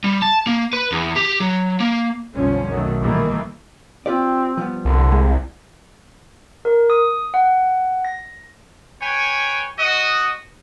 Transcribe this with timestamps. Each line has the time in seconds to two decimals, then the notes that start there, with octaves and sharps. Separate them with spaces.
0.04 G3
0.22 A5
0.47 A#3
0.73 B4
0.92 E2
1.16 G4
1.40 F#3
1.80 A#3
2.35 B1 F2 D3 F3 G3 C#4
2.69 B1 D#3 F#3 A3
3.01 A#2 D#3 E3 G3 A3 A#3
4.06 C4 F4 G4 D5
4.57 F3 G3 B3
4.85 C2 D3
5.12 G#3
6.65 A#4
6.90 D#6
7.34 F#5
8.05 A#6
9.01 B4 C#5 G5 G#5
9.77 F#4 D#5